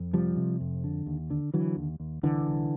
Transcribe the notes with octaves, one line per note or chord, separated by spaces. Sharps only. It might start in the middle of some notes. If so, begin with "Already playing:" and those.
Already playing: F2
C3 F3 G3
C3
F2
D3
D#2
D3
D3 E3 F#3
D#2
D#2
C2 D3 E3
C2